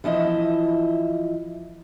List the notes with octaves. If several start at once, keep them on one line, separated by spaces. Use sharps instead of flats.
E3 F3 E4 D#5 E5